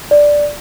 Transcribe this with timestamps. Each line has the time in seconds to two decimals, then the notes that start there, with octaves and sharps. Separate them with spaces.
0.11 D5